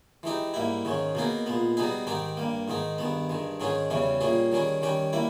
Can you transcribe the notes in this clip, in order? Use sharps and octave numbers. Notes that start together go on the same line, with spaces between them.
E3 G#3 D#4 G4
G#2 G3 A#3 E4
G#2 D#3 G#3 C#4
B2 A#3 D#4 G#4
A#2 G#3 B3
B2 G3 B3 D#4 G#4
G#2 D#3 G#3 D#4 G4
G2 G3 A#3
G#2 D#3 G#3 D#4
G2 D#3 G#3 B3
G2 D#3 G#3
G#2 D#3 G#3 C#4 G#4
E2 C#3 E3 G3 C#4
A#2 G3 C#4 G#4
D#3 G3 C#4 G#4
D#3 G3 C#4 G4
G3 A#3 E4